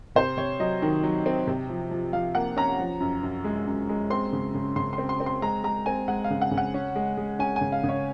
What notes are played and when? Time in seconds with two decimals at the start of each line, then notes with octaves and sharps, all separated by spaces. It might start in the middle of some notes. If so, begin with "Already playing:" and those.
0.16 C3 C5
0.37 C3 C#5
0.60 F#3 D#5
0.82 D#3
1.03 F#3
1.26 C4
1.47 C3
1.69 F3
1.91 F3
2.13 F3 F5
2.35 A#3 F#5
2.57 C#4 A#5
2.80 F3
3.00 F#2
3.23 F#2
3.44 G#3
3.67 F#2
3.89 G#3
4.10 C4 C6
4.33 C#3
4.54 C#3
4.76 C#3 C6
4.93 C6
4.98 C4
5.09 C6
5.20 C4
5.26 C6
5.42 G#3 A#5
5.64 G#3 A#5
5.86 C4 G#5
6.08 G#3 F#5
6.24 F5
6.30 C#3
6.41 F#5
6.51 C#3
6.58 F#5
6.74 C#4
6.96 G#3
7.17 G#3
7.39 C#4 G#5
7.56 G#5
7.61 C#3
7.72 F5
7.84 C#3
7.89 C#5